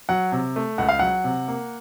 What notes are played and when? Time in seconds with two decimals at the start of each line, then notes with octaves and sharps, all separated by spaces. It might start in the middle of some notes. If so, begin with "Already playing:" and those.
0.09 F#3 F#5
0.32 C3
0.56 A3
0.78 C#2 F#5
0.89 F5
0.99 F#3 F#5
1.24 C3
1.48 A#3